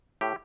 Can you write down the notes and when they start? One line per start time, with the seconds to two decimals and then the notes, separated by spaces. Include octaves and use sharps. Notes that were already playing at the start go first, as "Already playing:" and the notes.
0.21 A2 G4